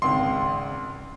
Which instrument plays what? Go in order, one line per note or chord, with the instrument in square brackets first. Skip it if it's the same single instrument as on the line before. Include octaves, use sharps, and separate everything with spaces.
[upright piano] G#1 C#2 [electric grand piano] C6